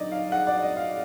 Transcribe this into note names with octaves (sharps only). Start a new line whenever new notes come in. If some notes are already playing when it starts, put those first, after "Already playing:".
Already playing: D3 F#3 D#4 D5 D#5
F5
F#5
D5
D#5
F5